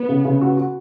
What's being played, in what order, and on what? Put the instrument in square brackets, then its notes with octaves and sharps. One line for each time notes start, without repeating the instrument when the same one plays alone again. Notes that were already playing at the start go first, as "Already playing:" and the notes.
Already playing: [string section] B3
[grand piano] C#3
C#3
F#4
F#4